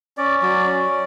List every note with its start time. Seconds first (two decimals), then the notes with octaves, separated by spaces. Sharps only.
0.18 C#4 D5
0.42 F#3 D5
0.67 C#4